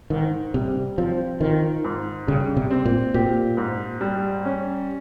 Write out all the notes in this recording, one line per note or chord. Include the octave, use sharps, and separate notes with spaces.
G#2 D#3
C3 G3
F3 C4
D#3 F4
G#2
C#3 G3
C3
C4
A#2
A#2 G4
G#2
G3
C#4